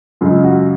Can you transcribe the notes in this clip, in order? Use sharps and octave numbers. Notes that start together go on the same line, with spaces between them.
F#2 C#3 G#3 F4
F#4